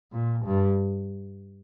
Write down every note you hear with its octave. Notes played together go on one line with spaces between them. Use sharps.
A#2
G2